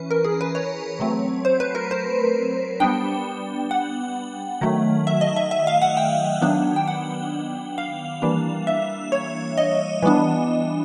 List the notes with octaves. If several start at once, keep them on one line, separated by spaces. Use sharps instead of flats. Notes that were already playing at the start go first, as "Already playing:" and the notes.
Already playing: E3 C#4 B4
A#4
G#4
B4
C#5
F#3 A3 C4
C5
B4
A#4
C5
G3 B3 D4 G5
F#5
D#3 F#3 A3
E5
D#5
E5
E5
F5
F#5
G5
D#3 F#3 B3 D4
G5
F#5
F5
E3 G3 A#3 D4
E5
C#5
D#5
E3 G3 B3 D4